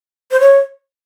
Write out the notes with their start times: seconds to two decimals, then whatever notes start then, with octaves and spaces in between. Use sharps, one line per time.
0.31 C5
0.40 C#5